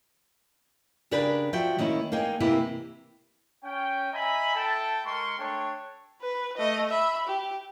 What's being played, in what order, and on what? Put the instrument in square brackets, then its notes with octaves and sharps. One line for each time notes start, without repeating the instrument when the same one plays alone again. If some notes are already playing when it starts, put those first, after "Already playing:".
[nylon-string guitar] C#3 D4 G4 G#4 A#4 B4
F3 F#4 E5 G5
D#3 A#3 C#4 E4
A#3 D#4 G#4 G5 G#5
C3 E3 A#3 E4 G4
[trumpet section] C#4 G5
D#5 E5 G#5 A#5 B5
E4 A4 G5 A5
G#3 A#4 C6 C#6
A3 D4 C#5 G5 A5
[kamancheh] B4
A3 D#5
E5 B5
G4